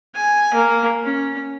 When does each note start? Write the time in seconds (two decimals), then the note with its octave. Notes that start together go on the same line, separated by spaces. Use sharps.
0.15 G#5
0.54 A#3
1.04 C#4